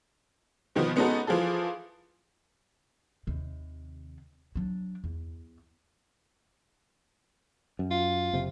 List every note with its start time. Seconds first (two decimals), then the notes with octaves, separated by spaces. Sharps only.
0.75 B2 D#3 F3 B3
0.96 G#3 B3 C#4 D#4 F#4 A4
1.27 E3 F3 F4 G#4 A4
3.27 D#2 C3
4.56 F#3 D4
5.04 E2
7.79 F#2
7.91 F4
8.33 F#1 C3